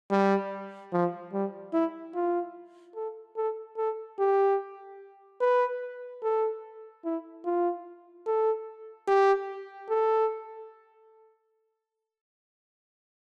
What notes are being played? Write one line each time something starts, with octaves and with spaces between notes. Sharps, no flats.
G3
F3
G3
E4
F4
A4
A4
A4
G4
B4
A4
E4
F4
A4
G4
A4